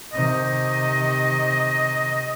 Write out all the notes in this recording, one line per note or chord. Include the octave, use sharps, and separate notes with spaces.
C3 D#3 D#5